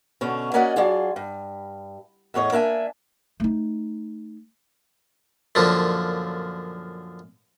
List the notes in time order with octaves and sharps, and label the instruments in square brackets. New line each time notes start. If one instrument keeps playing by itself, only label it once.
[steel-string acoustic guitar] B2 D3 C#4
A#3 C#4 F#4 D5 D#5 F#5
F#3 D4 F4 G#4
G2
E2 A2 C#5 D#5
A#3 D4 E5 G#5
[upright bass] A3 D#4
[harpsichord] F#2 A#2 D3 F3